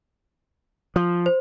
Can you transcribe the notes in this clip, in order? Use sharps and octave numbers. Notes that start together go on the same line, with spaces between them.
F3
C5